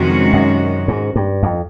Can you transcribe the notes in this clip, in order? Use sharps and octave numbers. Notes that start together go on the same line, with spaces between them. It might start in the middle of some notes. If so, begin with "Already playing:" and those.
Already playing: F2 C3 D#3 G#3 C#4 F#4
F#2
G#2
G2
F2